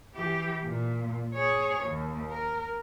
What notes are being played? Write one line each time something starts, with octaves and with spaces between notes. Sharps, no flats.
E3 G4
A#2
G#4 C#5
D#2
A#4